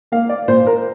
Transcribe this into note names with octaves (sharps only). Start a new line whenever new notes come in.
A#3 F5
D5
A#2 C5
A#4